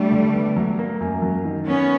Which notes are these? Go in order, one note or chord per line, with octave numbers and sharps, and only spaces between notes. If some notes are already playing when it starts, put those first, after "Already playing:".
Already playing: G3 A3 D4
D3
B3
F#3
A#3
F#2
F#3
D#3
A#3 B3 C#4